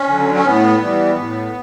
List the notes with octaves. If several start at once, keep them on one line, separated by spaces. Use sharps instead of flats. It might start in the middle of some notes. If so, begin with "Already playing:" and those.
Already playing: C#4
D3 F#3
C#4
A2 B3
E3 G3
A2